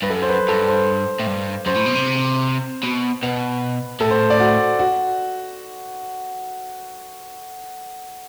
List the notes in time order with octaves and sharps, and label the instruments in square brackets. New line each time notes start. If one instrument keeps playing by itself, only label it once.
[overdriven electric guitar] G2 [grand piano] B4
[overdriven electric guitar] F#2 [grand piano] A4
[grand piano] C5
B4
[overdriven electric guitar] G2 [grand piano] A4
[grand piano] C5
[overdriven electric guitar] A2
G2
[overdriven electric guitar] F#2 [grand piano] C5
[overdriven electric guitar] A2
B2
C3
B2
[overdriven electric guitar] B2 [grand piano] B4
[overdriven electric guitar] A2 [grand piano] A4
[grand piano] C5
D5
F#4
F#4